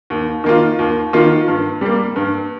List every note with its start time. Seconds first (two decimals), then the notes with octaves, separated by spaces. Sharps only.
0.10 D#2
0.44 D#3 A#3 F4
0.79 D#2
1.13 D#3 A#3 F4
1.48 G2
1.81 G3 A#3
2.16 G2